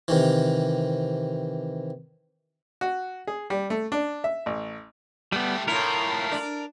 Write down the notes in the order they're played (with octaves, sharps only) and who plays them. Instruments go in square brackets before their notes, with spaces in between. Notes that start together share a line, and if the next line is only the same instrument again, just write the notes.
[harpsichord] C3 D#3 E3
[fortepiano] F#4
G#4
G3
A3
D4
E5
A1
[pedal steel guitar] G3 B3 [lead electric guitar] A3 G4
[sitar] A2 E4 [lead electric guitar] A3 F4 [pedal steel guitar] A#4
[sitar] D4 D5